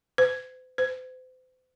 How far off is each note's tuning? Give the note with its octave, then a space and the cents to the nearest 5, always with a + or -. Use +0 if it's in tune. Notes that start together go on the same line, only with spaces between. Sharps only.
C5 -45
C5 -40